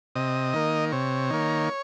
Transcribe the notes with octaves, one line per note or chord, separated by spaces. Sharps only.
C3 D#5
D#3 A#3
C3 C#5
D#3 A#3